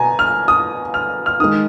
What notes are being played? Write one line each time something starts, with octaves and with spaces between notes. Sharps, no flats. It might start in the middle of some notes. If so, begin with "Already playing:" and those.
Already playing: B2 G#5 A#5
F6
D#6
F6
F6
D#3 G#3 D#6